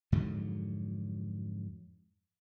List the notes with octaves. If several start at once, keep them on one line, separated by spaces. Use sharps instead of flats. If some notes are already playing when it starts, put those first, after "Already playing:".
F2 G#2 D3 F#3